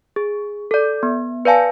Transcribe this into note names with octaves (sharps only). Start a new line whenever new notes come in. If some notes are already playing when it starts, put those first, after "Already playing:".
G#4
A4 D5
B3
B4 D5 F5 G#5 A5